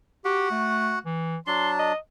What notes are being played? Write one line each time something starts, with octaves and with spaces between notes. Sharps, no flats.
F#4 G4 F#5
A3
E3
F#3 D4 A5 C6
D#5